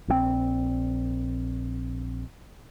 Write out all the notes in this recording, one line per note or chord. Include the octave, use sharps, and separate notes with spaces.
A#1 D#3 C4